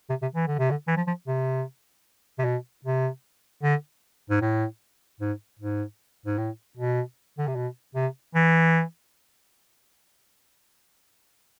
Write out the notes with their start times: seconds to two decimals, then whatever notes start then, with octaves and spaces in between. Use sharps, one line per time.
0.09 C3
0.22 C3
0.35 E3
0.47 D3
0.59 C3
0.71 D3
0.87 E3
0.97 F3
1.07 F3
1.27 C3
2.38 C3
2.45 B2
2.84 C3
3.63 D3
4.30 G#2
4.41 A2
5.20 G#2
5.59 G#2
6.26 G#2
6.38 A2
6.77 B2
7.38 D3
7.47 C3
7.55 B2
7.95 C3
8.35 E3